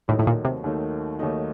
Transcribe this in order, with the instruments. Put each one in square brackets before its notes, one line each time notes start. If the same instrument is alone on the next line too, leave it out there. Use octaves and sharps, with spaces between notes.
[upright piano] D#2 D#3 F#3 A3 D#4 [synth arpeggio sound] A2
[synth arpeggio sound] A2
A#2
C3
[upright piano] D#2 D#3 F#3 A3 D#4
D#2 D#3 F#3 A3 D#4